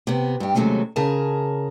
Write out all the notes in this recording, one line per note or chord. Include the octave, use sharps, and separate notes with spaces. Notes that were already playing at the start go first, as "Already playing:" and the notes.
C3 B3
G2 G4
D#2 C3 F#3 G#3 A3 C#4
C#3 G#4 A#4 A5